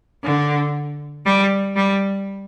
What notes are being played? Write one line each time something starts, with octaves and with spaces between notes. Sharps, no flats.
D3
G3
G3